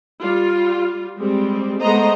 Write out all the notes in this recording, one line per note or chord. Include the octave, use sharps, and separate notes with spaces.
G3 F4
G3 G#3 C4
G#3 A3 B3 C5 D#5 A#5